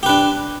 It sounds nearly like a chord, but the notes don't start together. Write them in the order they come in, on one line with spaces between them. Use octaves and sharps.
G4 B4 D4